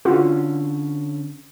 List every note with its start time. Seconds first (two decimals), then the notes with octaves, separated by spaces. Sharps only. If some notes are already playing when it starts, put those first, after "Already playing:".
0.05 D3 C#4 F4 F#4